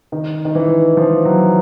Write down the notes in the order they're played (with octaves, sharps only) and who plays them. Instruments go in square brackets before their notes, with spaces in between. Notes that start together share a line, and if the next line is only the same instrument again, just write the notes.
[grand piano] D#3
D#3
E3
F3
F#3